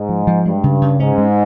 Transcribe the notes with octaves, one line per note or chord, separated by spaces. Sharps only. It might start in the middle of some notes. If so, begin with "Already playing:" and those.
Already playing: G#2
F3
F3
G2 G#3
C#3
C#3
G#2 C#4
G#3